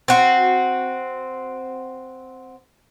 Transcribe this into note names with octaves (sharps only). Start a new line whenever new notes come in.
C4 F#4